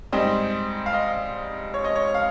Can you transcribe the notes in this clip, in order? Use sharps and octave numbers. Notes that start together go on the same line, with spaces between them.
G#2 G3 C4 D#5
F5
D#5
C#5
D#5
C#5
F5